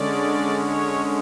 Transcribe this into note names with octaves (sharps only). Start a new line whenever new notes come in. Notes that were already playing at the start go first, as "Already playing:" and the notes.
Already playing: D3 G#3 C#4 D5
C#5